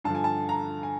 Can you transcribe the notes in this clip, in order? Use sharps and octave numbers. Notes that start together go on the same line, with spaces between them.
G2 D3 F3 A5
G#5
A5
A#5
G#5